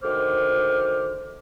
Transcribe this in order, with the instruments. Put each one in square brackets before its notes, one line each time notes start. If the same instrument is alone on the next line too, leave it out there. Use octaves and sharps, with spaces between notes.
[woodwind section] D2 D#3 C5 D6 F6